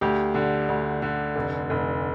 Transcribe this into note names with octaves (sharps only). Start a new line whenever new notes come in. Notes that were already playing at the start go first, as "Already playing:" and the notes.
D2 G4
D3
D2
D3
F1
F1